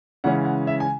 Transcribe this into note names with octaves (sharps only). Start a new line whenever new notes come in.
C#3 E3 G#3 C#4 F#5
F#5
E5
G#5